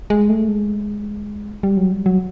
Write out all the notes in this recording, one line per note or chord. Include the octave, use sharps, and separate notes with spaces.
G#3
A3
G#3
G3
F#3
G3
F#3